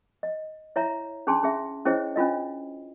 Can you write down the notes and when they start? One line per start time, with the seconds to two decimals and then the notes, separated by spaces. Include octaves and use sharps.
0.23 D#5
0.76 E4 C#5 E5 A#5
1.27 C#4 D4 G#4 A5 C6
1.43 C#4 G#4 E5
1.85 C#4 E4 G#4 C5 C#5 D#5
2.16 C#4 D4 F4 D#5